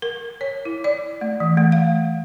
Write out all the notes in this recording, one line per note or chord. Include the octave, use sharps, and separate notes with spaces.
A#4
C#5
E4
D5
A3
E3
A3
F5